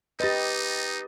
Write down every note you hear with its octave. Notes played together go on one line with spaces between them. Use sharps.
D#4 G4 B4 D#5 A6